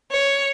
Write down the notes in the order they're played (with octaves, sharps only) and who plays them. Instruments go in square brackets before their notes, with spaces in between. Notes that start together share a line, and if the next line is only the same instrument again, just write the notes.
[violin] C#5